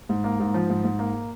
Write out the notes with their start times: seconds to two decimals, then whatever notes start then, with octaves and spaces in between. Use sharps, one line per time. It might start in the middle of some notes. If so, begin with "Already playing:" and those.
0.09 G#2
0.24 A#3
0.40 G#2
0.54 F3
0.70 G#2
0.84 G#2
0.99 A#3